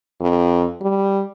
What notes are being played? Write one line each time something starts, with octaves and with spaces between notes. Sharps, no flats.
F2
G3